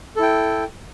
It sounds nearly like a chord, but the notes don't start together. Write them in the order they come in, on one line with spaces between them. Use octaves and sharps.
A4 E4 G5